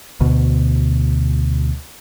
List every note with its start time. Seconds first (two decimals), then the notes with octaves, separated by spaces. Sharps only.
0.21 D2 B2